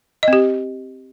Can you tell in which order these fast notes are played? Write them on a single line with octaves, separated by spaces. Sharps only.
D#5 C4 G4